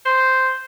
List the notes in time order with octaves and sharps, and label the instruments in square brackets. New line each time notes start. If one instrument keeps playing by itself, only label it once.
[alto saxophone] C5